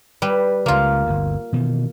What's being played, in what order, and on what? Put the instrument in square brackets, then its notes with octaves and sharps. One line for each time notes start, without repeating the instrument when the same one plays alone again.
[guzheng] G3 B4
[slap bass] C#2 C#3 [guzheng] A#3 F4
[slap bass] G1 D2
B2 D#3 E3